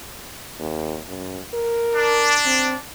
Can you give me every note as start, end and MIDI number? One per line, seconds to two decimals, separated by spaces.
0.59 0.98 39
1.08 1.39 42
1.54 2.35 70
1.96 2.79 62
2.45 2.75 60